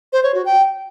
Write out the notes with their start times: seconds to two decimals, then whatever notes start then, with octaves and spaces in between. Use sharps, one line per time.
0.13 C5
0.24 C#5
0.34 F#4
0.45 G5